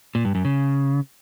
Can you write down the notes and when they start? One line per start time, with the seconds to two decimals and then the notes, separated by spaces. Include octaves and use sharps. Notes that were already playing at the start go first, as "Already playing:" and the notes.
0.15 A#2
0.25 G2
0.35 F#2
0.45 C#3